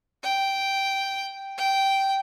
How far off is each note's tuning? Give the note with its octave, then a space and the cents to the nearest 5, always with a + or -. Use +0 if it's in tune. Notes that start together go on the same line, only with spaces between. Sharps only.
G5 -5
G5 -10